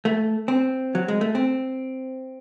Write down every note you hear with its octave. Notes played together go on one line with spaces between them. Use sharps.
A3
C4
F#3
G#3
A3
C4